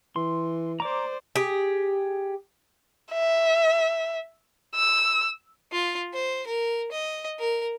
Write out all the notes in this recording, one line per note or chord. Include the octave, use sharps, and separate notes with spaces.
E3 C6
C5 D5 A#5 D6
G4 G#4
E5
E6
F4
C5
A#4
D#5
A#4